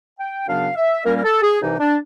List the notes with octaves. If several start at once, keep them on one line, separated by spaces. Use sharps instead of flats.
G5
F#2 C#3 F#3 B3 D4 F5
E5
A#2 G3 A#3 C#4 A#4
A#4
A4
G#4
C2 C3 E3 D#4
D4